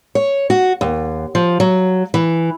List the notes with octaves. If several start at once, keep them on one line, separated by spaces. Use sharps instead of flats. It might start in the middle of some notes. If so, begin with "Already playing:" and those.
C#5
F#4
D#2
F3
F#3
E3